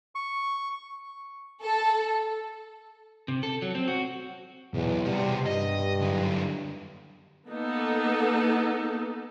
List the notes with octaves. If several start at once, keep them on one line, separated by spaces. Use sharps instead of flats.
C#6
A4
C3
A4
F#3
C4
F#4
B1 E2
C3 G3 B3
G2 D#5
F#2 D3
A#3 B3 D#4 A4